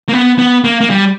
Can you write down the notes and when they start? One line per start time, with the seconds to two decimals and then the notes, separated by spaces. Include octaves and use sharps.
0.09 A#3
0.13 B3
0.39 B3
0.64 A#3
0.81 A#3
0.90 G3